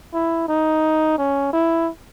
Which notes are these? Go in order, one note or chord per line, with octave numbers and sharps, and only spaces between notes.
E4
D#4
C#4
E4